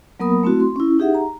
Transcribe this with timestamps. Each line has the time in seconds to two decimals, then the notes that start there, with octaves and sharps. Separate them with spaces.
0.20 F#3 A#3 B3 A#4 B5 D#6
0.43 A3 C4 E4 F#4
0.60 C6
0.76 C#4 E4
0.99 D#4 G4 G#4 E5 F#5
1.14 A#5